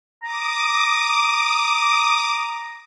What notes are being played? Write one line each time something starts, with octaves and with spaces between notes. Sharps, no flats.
A#5 D6 D#6